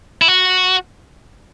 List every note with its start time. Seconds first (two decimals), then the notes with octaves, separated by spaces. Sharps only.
0.22 E4
0.28 F#4